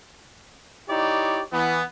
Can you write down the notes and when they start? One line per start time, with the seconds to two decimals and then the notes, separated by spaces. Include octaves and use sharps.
0.89 D#4 E4 G4 C#5 D5
1.52 E3 B3